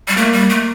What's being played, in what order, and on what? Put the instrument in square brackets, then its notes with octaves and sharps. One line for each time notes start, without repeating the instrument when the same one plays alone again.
[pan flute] G3
[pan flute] A3 [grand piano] A#3
[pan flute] G3
A3